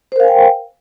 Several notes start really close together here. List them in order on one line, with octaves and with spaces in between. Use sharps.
C5 A#4 F5 G#5 G5